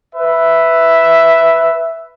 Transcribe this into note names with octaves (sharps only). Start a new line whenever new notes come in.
B4 E5